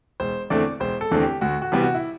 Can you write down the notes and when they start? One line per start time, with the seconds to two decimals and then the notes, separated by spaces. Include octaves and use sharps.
0.20 E1 C5
0.50 E2 D3 A3 C4 D5
0.80 E1 C5
1.01 A4
1.11 E2 D3 A3 C4
1.21 G4
1.41 D2 F#4
1.62 F#4
1.72 C3 E3 G3 B3
1.82 F#4
1.95 E4